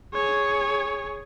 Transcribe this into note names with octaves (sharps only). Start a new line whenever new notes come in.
G#4 C#5